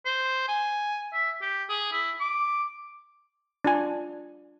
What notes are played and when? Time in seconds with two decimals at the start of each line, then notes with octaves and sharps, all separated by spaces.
0.05 C5
0.48 G#5
1.13 E5
1.41 G4
1.69 G#4
1.92 E4
2.20 D6
3.65 D4 F4 G#5